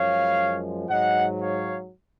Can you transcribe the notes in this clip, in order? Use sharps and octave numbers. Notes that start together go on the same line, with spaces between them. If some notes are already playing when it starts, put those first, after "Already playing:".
Already playing: F#2 F3 G#3 C#5 F5
G#2 F#3 D#5 F#5
C#5 F5